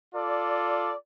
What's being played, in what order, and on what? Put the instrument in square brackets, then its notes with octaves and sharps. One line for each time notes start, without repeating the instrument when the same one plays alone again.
[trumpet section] F4 A4 D5